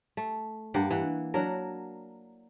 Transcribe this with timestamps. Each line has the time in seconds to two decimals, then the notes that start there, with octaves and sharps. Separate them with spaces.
0.17 A3
0.74 G2 A#3 G4 F#5
0.91 E3 F#5
1.34 F#3 D4 A#4